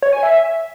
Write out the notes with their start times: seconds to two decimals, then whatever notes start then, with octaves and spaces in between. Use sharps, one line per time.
0.02 C#5
0.13 G#5
0.23 E5